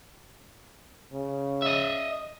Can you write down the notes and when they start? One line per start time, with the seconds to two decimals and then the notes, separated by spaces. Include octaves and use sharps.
1.13 C#3
1.62 D#5 E5